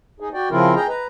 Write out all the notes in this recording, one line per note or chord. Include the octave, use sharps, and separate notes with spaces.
D#4 G#4
F#4 D5 G5
C#3 F3 C4 E4 F4 A#4
G#4 D#5 G5 A#5
B4 A#5